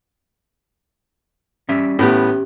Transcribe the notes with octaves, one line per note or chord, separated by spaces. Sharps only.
G3 C#4 E5
A2 B3 C#4 G4